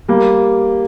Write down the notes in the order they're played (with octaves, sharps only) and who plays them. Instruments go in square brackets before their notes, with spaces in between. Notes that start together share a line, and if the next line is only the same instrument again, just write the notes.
[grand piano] G3 A#3